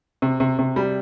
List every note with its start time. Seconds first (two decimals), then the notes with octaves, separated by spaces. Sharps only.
0.22 C3
0.40 C3
0.59 C3
0.76 G3